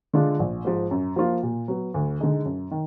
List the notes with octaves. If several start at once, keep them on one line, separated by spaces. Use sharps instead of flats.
D3 G#3 D4 F4
A#1
G#2 F3
F#2
F3 A#3 F4
A#2
F#3 B3
D2
D3 G#3 D#4 G#4
F#2
D#3